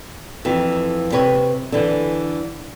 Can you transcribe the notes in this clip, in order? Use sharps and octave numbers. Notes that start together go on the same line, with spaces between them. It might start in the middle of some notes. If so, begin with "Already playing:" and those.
F2 E3
C3 B4 C#5
D3 E3